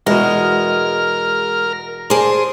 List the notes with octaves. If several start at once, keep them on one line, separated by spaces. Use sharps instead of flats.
E2 B2 G#3 A#4 F6
G#4 A#4 C5 D5 A5